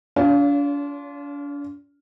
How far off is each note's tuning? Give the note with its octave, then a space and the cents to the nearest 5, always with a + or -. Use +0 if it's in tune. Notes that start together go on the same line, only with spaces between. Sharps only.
D4 -40 F4 +0 C#5 +35